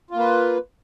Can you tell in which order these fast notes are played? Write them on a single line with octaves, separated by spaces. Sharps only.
F4 A#3 B4